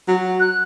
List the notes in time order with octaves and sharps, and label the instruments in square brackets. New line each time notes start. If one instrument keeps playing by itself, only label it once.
[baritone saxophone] F#3
[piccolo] F#6